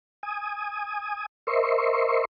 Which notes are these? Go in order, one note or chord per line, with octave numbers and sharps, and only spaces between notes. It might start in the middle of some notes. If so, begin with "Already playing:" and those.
G#5 D#6
A#4 C5 D#5 E5 C6 C#6